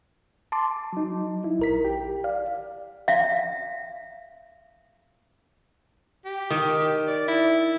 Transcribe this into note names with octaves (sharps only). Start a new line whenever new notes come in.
A5 C6 D6
F#3 D#4
E4
A#1 A#4 B6
G4
D5 F5
E5 F5
G4
D#3
D5
E4